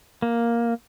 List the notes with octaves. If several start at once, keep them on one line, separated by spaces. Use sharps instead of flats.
A#3